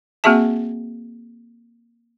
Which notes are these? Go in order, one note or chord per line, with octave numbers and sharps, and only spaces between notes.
A#3 C4 F#4 G#4 E5 A5